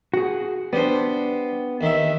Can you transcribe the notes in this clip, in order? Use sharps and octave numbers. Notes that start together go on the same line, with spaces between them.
F#4 G#4
G3 B3 D4 C5
D#2 D#3 E5